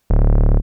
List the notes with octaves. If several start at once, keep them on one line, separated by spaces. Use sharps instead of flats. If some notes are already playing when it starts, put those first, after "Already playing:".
D1